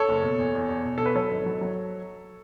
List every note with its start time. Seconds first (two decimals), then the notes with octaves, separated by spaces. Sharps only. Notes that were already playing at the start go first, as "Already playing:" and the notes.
Already playing: A4 C#5
0.09 F#1
0.23 B2
0.39 E2
0.55 E2
0.69 E2
0.85 B2
0.98 B2 A4
1.06 B4
1.15 F#3 A4 C#5
1.31 G#1
1.46 F#3
1.61 F#3